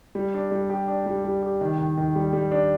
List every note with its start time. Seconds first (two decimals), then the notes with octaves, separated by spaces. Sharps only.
0.15 G3
0.34 D4
0.51 G3
0.70 G4
0.88 D4
1.06 G3
1.24 G3
1.42 G4
1.61 D#3
1.78 D#3
1.97 D#3
2.15 G3
2.33 G3
2.51 D4